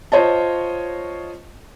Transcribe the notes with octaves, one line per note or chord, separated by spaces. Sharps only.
F4 C5 C#5 D#5 A5